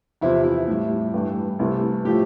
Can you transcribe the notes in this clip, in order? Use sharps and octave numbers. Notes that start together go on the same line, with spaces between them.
E2 C3 F3 E4
E4
A2 G3
G2 E3 A3
C2 C3 E3 A3
A2 F3 A3 G4